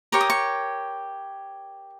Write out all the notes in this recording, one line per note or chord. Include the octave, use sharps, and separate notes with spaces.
G4 A#4 C#5 C#6
D#6
C#6